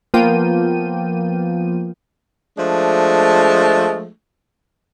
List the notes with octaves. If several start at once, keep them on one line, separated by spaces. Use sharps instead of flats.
F3 A#3 B3 F4 G5 D#7
F3 G#3 A3 D4